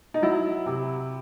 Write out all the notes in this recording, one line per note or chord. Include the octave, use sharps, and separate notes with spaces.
D#4
F#3 E4
C3